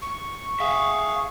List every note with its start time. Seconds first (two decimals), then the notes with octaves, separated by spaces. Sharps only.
0.02 C#6
0.60 G#4 E5 F5